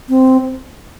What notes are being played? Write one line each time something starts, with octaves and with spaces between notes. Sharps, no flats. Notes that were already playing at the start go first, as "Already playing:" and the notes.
C4